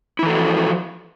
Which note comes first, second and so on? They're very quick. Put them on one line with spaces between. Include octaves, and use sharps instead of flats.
E4 E3 A4 F#4 F3